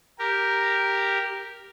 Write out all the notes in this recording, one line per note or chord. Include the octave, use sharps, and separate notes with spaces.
G4 A#4